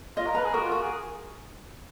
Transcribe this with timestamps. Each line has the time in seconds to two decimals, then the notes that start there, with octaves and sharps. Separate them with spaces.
0.17 F4 D#5
0.26 A#4
0.35 B4 A#5
0.45 G#4
0.54 F#4 A#4
0.62 F4
0.72 F#4 A#4
0.81 G#4